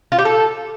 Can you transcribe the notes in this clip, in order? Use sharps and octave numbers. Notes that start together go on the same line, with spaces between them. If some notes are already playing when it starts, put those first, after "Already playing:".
F4
G4
A4